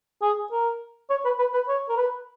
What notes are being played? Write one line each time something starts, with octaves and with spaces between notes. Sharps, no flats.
G#4
A#4
C#5
B4
B4
B4
C#5
A#4
B4